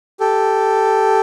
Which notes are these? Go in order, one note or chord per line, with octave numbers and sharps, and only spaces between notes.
G4 A4